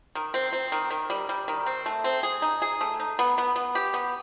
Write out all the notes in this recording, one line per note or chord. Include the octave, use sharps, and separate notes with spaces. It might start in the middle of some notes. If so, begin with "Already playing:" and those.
D#3
C4
C4
D#3
D#3
G3
G3
D#3
C4
A3
C4
G#4
D#4
G#4
A3
D#4
B3
B3
B3
G4
B3